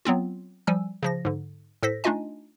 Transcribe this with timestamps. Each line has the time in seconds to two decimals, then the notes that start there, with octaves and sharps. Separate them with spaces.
0.05 F#3 B3 C4 F4
0.67 F3 G3 G#5 E6
1.03 C#3 F3 A#6
1.25 G#2 D3
1.83 A2 A4 C5 A#6 B6
2.04 A3 D4 D#4 F4 D#5 G#5